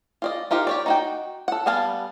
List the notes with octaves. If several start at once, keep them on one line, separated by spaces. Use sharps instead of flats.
F4 D5 D#5
D#4 F4 G4 A#4 C5
G4 C#5 D5
D#4 F#4 G5
A4 F#5
G3 B3 F5 G#5 A5